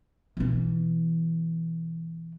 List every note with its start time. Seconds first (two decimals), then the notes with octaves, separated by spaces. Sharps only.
0.37 B2 E3